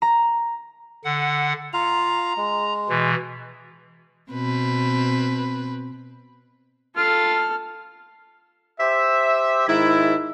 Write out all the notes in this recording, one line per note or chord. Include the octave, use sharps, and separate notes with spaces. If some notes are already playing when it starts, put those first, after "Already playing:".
A#5
D3 F#5
F4 F5 A#5
G#3
B2 E3
B2 C4 B4
F4 A4 F6
G4 C5 E5
G#2 D#3 E4